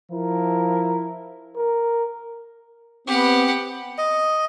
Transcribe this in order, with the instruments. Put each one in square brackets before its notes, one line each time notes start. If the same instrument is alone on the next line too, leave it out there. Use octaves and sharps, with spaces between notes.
[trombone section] F3 E4 A#4
[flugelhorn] A#4
[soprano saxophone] B3 [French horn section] C4 [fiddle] G4 F#5
[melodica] D#5